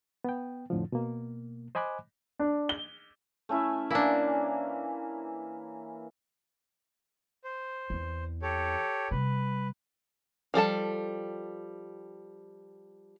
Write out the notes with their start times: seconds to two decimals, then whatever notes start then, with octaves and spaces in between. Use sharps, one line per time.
0.24 B3 G5
0.70 F2 A2 D3 F3
0.92 B2 A#3
1.75 C5 D#5 G#5 B5 D6 F#6
2.39 D4
2.69 G7
3.49 A3 C#4 E4
3.90 E3 A#3 D4 E4
7.44 C5
7.90 E2 C4
8.42 G4 A4 C#5
9.11 C3 G3 B4
10.54 F3 G3 A4 A5